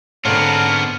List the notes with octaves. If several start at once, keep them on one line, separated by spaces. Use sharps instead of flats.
G#2 D3 B3 C4 C#5 A5 A#5 F6